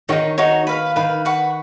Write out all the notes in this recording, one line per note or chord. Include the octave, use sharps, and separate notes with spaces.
D#3 D#4 F#4 C#5
D#4 F#4 C#5
B4 F5 B5
D#3 B4 F5 B5
B4 F#5 C#6